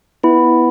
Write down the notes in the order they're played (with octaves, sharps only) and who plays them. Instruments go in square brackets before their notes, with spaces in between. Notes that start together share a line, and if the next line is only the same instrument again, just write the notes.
[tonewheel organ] B3 [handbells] E4